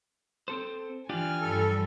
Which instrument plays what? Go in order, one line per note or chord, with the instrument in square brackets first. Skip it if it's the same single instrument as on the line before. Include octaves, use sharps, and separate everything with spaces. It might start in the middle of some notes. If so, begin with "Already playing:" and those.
[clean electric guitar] C4 A4 C5
[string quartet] E3 G#5 F6 [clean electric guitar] D4 F4 G4
[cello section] G2 F3 G3 [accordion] A4